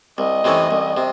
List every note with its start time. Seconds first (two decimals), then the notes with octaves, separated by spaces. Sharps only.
0.18 C2 D#5
0.44 C3 E3 A3 C#4
0.71 C2
0.97 C3